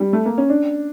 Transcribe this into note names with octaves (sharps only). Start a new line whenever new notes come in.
G3
A3
A#3
C#4
D4